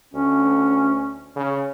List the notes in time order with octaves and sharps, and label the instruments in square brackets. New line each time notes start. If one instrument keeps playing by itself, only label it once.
[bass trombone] D2 [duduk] C#4
[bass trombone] C#3